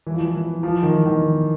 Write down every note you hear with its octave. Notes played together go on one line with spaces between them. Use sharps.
E3
F3
E3
E3
F3
D#3
E3
D#3